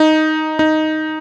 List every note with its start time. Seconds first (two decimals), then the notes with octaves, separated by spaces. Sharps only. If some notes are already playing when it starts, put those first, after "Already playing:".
Already playing: D#4
0.59 D#4